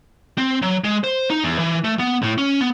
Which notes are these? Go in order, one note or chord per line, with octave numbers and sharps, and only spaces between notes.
C4
F#3
G#3
C5
D#4
E2
E3
A3
B3
A2
C#4
B3